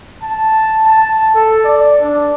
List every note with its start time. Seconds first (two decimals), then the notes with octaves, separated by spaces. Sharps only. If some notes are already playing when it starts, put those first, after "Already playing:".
0.23 A5
0.88 A5
1.35 A4
1.64 D5
2.01 D4